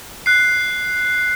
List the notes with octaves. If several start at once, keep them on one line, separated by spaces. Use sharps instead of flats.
F#6 C7